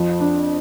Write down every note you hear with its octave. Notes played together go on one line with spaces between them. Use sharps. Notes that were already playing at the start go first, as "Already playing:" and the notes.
Already playing: F2 F3
D4